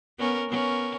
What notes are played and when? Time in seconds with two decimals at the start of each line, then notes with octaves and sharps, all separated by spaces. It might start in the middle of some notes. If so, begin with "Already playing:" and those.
0.18 B3 C#4 A#4
0.49 B3 C#4 A#4